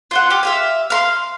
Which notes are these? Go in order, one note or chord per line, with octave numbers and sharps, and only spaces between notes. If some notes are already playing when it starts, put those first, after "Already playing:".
F4 C5 F#5
G4 F5
E5 F5 G#5
F5 B5 C6